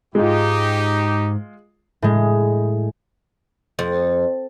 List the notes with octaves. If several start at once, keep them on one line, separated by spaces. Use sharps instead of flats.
G#2 G#3 D#4 F4 G4
A2 G#3
F2